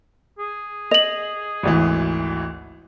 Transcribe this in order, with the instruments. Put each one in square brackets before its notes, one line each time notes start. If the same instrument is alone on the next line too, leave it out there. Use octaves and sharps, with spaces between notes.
[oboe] G#4
[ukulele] D#5 [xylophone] F7 F#7
[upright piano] G#1 D2 E3